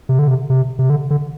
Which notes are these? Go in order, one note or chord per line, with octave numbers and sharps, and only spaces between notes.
C3
D3
C3
C3
C3
D3
D3